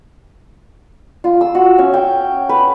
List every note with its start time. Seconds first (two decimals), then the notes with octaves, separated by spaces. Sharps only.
1.24 F4
1.41 E6
1.55 F#4
1.78 C#4
1.94 G5
2.49 B4